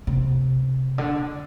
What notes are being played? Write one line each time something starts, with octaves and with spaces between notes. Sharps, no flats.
C3
D3